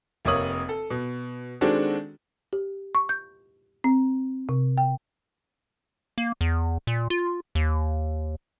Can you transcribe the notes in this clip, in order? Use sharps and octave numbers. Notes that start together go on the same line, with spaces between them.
F1 C3 A#3 C#5 D#6 F#7
A4
B2
D#3 G#3 C4 D4 F#4 A4
G4
C#6
G6
C4
C3
G5
A#3
E2
A#2
F4
D#2